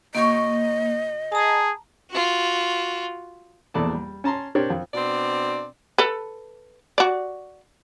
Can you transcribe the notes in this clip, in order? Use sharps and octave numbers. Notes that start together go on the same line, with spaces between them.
C#3 A#3 F#4 C#5 D#5
G#4 A5 A#5
F4 F#4
A#1 E2 A4 D5 A5
G3
C#4 A5 A#5 C6
C4 D4 G4 A#4 C#5
F2
B2 C4 D4 D5
A4 B4
F#4 D5